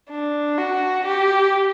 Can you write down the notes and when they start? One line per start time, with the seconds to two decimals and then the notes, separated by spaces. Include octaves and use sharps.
0.10 D4
0.58 F#4
1.05 G4